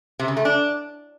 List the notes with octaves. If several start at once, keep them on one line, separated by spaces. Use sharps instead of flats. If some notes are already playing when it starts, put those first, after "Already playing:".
C3
C#3
A3
D4